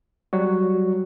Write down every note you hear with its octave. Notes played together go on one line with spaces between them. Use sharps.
F#3 G3 F#4